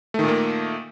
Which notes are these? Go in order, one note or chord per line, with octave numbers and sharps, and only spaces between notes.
A#2 D#3 A3 A#3